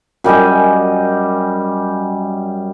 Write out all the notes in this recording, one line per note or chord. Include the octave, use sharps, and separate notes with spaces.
F#2 G3 D#5 G#5